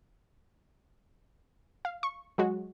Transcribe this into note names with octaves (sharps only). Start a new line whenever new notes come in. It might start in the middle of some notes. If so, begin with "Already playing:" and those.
F5
C#6
F#3 G#3 F#4